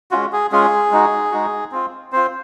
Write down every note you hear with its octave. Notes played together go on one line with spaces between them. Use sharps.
G#3 C#4 F4 F#4
G#4
G#3 C#4 F4 G#4
G#3 D#4 F#4
G#3 D#4 F#4
C4 F4
C4 F4 C5